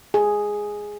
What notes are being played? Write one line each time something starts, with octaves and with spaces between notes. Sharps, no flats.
G#4